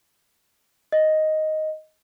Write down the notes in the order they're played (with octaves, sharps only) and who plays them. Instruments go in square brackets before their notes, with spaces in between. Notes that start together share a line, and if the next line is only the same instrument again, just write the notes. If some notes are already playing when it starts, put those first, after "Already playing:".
[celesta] D#5